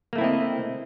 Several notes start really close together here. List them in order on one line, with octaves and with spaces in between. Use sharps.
A#3 A3 E4 C4 D#5